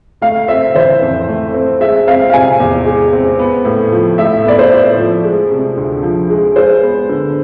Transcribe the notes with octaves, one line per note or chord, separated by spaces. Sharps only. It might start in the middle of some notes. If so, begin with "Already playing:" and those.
A3 F5
C4 E5
E3 C5
F2
A3
C4
G#3 E5
C4 F5
F5
C3 G#5
E2
G#3
C4
B3
A2
F3
A2 E5
B3 D5
C5
A2
F3
G#3
C3
D2
F3
G#3
G#3 C5
B3
D3